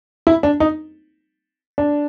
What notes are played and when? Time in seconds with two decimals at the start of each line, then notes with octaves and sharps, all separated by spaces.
0.27 E4
0.43 D4
0.60 D#4
1.78 D4